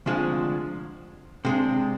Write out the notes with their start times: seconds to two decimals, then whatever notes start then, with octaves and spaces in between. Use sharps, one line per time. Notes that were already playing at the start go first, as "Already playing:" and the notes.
0.06 D2 C3 F3 G#3 D4
1.45 C3 G#3 D4